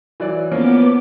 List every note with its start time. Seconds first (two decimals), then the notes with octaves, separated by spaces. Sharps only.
0.20 E3 F#3 D5
0.51 F3 A#3 B3 C#4 D6